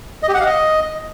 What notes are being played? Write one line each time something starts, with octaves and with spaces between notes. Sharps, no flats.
D#5
G4
F#5
F5
D#5